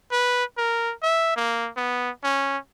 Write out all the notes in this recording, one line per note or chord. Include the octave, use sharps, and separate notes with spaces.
B4
A#4
E5
A#3
B3
C#4